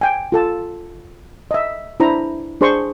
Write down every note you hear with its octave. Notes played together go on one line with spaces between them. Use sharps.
G5 G#5
F4 A4 A5
D#5 E5
D4 E4 C5 A#5
D4 G#4 C5 C6 C#6